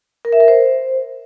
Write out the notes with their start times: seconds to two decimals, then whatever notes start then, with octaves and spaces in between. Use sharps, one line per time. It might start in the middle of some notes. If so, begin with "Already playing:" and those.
0.25 A#4
0.32 E5
0.40 A#4
0.48 C5